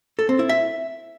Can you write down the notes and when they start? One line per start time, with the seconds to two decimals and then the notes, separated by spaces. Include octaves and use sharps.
0.19 A4
0.29 C4
0.39 E4
0.49 E5